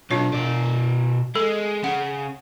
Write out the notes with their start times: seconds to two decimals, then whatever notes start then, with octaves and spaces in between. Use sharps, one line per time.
0.11 B1 D4 F4 C#5
0.34 B2 D5
1.35 G#3 A4
1.84 C#3 F#5